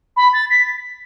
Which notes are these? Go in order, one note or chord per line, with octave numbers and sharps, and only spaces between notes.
B5
A6
B6